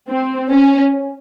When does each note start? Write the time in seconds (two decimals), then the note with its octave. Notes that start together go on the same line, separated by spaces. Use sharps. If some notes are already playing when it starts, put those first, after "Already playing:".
0.08 C4
0.50 C#4